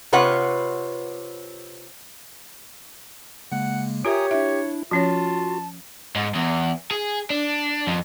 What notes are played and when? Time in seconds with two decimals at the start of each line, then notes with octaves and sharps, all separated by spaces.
0.13 C3 F4 B4 C#5 F#5
3.52 C#3 G#3 A#3 F#5
4.05 F4 G4 A#4 C#5 E5 G#5 A#5 D#6
4.31 D4 E4 E5
4.91 F3 C#4 F4 F#4 C#5 A5
6.16 G#2
6.35 E2
6.91 G#4
7.30 D4
7.87 F2